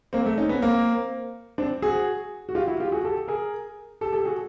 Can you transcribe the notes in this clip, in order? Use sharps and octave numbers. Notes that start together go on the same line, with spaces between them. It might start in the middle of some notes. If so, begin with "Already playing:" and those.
A#3 C4
A3
C#4 D#4
B3 C#4
A#3 C4
C4 D4
F#4 G#4
F#4
F4 G4
E4 F#4
F4 G4
F#4 G#4
G4 A4
G#4 A#4
G4 A4
G4 A4
F#4 G#4